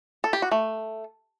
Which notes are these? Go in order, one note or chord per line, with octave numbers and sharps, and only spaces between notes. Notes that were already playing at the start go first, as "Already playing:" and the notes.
A4
G4
F#4
A3